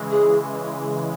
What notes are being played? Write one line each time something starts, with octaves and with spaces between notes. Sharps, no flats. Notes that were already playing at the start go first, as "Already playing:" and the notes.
Already playing: C#3 E3 G#3
G#4